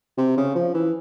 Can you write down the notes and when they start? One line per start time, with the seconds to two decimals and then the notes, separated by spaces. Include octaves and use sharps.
0.18 C3
0.37 C#3
0.55 F3
0.74 E3